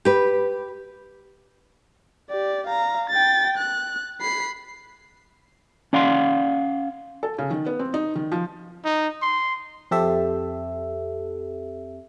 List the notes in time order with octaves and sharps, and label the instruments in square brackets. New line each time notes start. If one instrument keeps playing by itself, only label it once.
[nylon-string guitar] G4 B4
[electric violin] G4 D5
F5 A#5
G5 A6
F#6
B5 C7
[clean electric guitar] C#4 D5 F5 F#5 C6
[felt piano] A4
C#3
D#3
B3
C4
D#4
D#3
F3
[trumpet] D#4
C6
[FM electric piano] F2 C4 G4 A4 E5